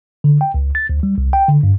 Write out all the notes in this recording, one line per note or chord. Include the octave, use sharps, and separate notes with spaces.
D3
G5
C#2
A6
D2
G3
C2
G5
D3
G2